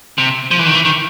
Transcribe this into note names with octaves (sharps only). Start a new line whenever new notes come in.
C3
F3
E3
D#3
E3
D#3